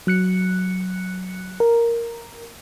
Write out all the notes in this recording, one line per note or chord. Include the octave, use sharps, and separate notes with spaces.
F#3 F#6 C#7
A#4